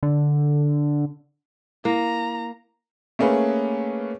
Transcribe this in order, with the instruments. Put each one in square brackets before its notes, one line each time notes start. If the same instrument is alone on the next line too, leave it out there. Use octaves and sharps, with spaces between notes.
[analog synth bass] D3
[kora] A#3 [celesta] E4 [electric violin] A#5
[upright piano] A3 A#3 C#4 G#4 B4